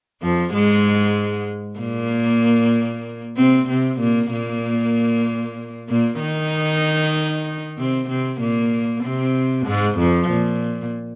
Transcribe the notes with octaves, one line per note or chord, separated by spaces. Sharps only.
F2 F3
G#2 G#3
A#2 A#3
C3 C4
C3 C4
A#2 A#3
A#2 A#3
A#2 A#3
D#3 D#4
C3 C4
C3 C4
A#2 A#3
C3 C4
G#2 G#3
F2 F3
A#2